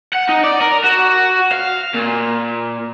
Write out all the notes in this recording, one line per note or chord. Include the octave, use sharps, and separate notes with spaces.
F#5
D#4
D5
A#4
F#4
F5
A#2